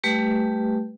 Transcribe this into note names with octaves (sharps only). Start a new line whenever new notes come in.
G3 A3 G4 B4